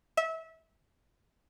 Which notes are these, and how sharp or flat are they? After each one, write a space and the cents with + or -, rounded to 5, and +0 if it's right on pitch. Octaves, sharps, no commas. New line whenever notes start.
E5 -25